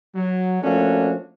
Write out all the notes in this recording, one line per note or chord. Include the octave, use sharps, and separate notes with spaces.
F#3
F3 A3 A#3 C#4 D4 F#4